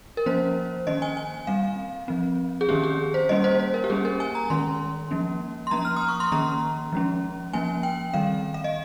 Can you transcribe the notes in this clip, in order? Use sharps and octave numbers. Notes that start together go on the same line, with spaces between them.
A#4
F3 A#3 C#4 C5
D#3 A#3 C#4 D#5
G#5
G#5
G3 C4 F5
F3 C4
G#4
D#3 A#3 C#4 G4
G#4
C5
G3 A#3 C#4 D#5
C5
C5
A#4
G4
G3 A#3 C#4 G#4
A#4
G#5
A#5
D#3 G#3 C#4 C6
F3 A#3 C#4
C6
F3 A#3 C#4 A#5
F6
D#6
C#6
C6
D#3 A#3 C#4 A#5
F3 G#3 C#4
F3 A#3 C#4 G#5
G5
D#3 G3 C4 F5
F5
D#5